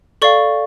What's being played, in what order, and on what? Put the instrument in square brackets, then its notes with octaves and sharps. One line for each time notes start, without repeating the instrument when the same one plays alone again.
[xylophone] A4 D5 F5 C#6